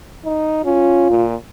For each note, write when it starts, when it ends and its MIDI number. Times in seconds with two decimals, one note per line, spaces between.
0.25 0.61 63
0.64 1.07 61
0.64 1.26 65
1.10 1.35 46